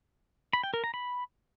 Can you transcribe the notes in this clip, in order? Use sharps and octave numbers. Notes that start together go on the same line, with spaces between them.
B5
G5
A#4
A#5
B5